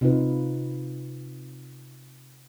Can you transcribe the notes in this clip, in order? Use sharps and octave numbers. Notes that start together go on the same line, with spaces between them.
C3 D#4 F4 B4